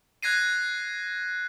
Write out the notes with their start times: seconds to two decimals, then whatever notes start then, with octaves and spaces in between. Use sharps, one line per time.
0.23 F#6 G#6 A#6 C7 D#7